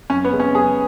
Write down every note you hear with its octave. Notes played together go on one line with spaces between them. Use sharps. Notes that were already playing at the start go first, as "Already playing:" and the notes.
F#2 C#4
B3
C#3 G#3
C#4
F#2 G#4